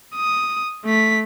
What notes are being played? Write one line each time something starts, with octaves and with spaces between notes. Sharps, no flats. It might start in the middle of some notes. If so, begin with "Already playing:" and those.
D#6
A3 B6